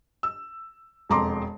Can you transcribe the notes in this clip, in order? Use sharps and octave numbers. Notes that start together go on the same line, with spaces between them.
E6
E1 F2 A#5 C6 D6